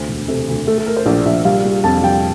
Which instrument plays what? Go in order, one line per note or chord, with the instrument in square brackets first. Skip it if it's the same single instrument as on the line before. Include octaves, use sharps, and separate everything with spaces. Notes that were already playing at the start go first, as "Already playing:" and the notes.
Already playing: [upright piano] D2 C5
E1
C3 A4
D2
A3 A4
A4
A3 A#4
C5
A#1 D5
A#1 E5
G3 F5
G3
F2 A5
G3 G5